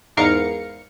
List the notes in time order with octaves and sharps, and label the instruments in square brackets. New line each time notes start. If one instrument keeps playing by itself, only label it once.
[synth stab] E2 G#2 A#4 F5 C#7